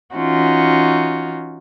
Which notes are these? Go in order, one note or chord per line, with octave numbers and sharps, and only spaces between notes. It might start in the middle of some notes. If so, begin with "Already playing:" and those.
E3 C#4 D#4 F4 F#4